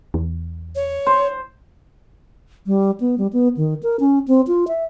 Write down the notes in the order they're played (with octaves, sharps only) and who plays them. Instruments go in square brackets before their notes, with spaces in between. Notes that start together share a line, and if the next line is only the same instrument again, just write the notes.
[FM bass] E2
[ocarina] C#5
[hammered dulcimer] C5
[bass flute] G3
B3
G3
B3
D#3
A#4
C#4
C4
F4
E5